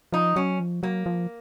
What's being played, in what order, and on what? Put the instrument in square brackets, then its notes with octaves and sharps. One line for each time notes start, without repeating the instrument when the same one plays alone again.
[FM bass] F3 [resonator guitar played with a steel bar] D#4
[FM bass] F#3 [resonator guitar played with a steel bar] C#4
[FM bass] F3
[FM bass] F#3 [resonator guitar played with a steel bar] A#3
[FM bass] F3